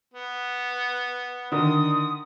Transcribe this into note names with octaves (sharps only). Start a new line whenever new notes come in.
B3
D3 D#3 D#6